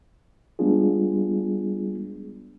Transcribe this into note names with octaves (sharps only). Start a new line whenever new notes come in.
G3 G#3 B3 D4 F4 G#4